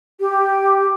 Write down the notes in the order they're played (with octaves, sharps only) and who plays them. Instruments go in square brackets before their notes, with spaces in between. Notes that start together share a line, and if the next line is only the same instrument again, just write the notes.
[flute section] G4